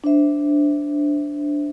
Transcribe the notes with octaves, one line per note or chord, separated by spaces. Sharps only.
D4 C5 E5